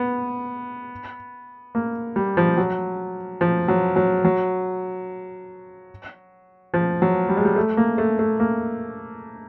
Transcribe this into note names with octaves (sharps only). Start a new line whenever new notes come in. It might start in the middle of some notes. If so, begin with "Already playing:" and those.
Already playing: B3
A#3
G3
F3
F#3
F3
F#3
F#3
F#3
F3
F#3
G3
G#3
G3
A3
A#3
A3
A3
A#3